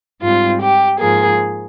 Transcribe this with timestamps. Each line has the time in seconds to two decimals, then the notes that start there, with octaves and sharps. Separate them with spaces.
0.21 G#2 G3 C4 F4
0.61 G4
0.99 G#2 F3 A#3 G#4